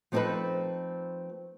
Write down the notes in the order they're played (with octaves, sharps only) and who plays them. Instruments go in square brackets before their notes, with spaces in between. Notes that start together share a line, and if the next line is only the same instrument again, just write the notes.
[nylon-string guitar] F3 A3 C4 D#4 A4 B4